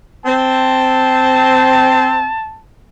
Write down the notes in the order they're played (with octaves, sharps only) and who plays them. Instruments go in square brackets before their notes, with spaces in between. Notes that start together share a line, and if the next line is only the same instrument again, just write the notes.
[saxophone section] C4 [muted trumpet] A5